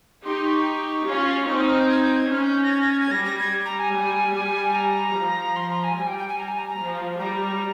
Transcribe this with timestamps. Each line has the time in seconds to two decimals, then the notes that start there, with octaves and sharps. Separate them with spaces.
0.25 D#4 G4 C6
0.46 C#6
1.06 C#4 F4
1.48 C4 D#4
1.57 D#6
1.68 F6
1.79 G6
1.89 G#6
2.02 G6
2.16 G#6
2.29 C#4 F6
2.43 G6
2.63 A#6
2.70 G#6
2.81 A#6
2.90 G#6
3.01 G#6
3.11 G3 A#6
3.25 A#6
3.39 G#6
3.65 A#5
3.79 G#5
3.93 G3
4.34 G3
4.74 A#5
5.15 F3
5.56 C6
5.69 A#5
5.83 G#5
5.97 G3 G#5
6.07 G5
6.18 G5
6.28 G#5
6.38 A#5
6.48 G#5
6.58 A#5
6.69 A#5
6.78 F3
7.19 G3 A#5